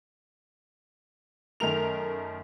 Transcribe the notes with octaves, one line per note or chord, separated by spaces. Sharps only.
F#2 D#3 A3 A#4 F7